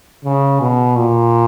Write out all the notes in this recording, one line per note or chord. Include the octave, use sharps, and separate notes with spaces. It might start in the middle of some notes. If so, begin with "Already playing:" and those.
C#3
B2
A#2